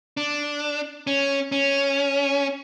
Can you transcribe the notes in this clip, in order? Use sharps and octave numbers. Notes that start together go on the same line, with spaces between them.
D4
C#4
C#4